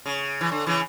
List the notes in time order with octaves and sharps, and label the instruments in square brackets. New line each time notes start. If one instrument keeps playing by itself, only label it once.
[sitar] C#3
E3
D3
C#3 E3